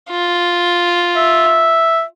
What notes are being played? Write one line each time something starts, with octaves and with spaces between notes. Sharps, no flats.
F4
E5